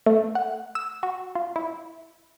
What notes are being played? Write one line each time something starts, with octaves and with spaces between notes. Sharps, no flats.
A3
F#5
E6
F#4
F4
E4